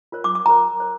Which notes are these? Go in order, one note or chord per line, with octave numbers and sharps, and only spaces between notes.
F4 A#4 C#5
D6
D6
F4 A#4 C#5 A#5
A#4 C#5